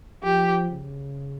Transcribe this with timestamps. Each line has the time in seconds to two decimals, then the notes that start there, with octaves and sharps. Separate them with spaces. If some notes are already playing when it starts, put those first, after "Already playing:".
0.23 F3 G4
0.70 C#3